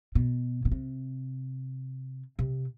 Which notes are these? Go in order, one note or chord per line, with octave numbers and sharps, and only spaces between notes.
B2
B2
C3
C3